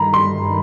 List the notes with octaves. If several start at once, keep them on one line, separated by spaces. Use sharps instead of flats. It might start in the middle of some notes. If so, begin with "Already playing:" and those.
Already playing: G2 D#3 G3 A#5 B5
C6